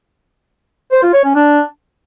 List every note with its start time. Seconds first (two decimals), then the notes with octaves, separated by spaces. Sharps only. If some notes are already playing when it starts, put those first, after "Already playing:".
0.92 C5
1.03 F4
1.14 C#5
1.25 C#4
1.35 D4